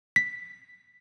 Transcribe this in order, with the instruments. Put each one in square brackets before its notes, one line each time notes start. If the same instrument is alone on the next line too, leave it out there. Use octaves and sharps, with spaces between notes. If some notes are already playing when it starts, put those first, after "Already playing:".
[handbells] B6